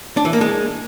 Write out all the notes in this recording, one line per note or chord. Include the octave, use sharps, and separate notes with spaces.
D4
E3
A#3
G#3